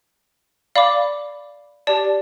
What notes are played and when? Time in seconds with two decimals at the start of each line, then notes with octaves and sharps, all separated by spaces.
0.76 D5 F5 B5 D6
1.87 G4 D5 A5